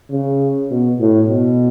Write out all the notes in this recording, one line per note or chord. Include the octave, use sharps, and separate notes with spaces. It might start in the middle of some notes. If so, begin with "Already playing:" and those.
C#3
B2
A2
B2